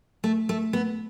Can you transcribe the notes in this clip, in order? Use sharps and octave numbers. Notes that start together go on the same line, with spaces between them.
A3
A3
B3